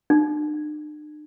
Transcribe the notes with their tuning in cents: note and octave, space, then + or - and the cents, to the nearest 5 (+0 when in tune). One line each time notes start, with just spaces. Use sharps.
D4 +45